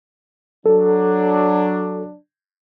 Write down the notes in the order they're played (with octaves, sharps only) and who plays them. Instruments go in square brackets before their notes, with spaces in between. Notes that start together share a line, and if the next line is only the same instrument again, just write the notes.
[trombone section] F#3 D4 [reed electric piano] A4